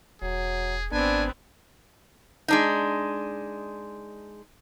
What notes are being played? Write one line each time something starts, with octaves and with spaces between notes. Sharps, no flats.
E1 F#3 G#4
G#1 B3 C4 D4 G#5
G#3 D4 D#4